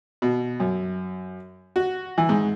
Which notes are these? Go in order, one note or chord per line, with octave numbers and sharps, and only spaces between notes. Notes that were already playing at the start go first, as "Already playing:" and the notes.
B2
F#2
F#4
E3
G#2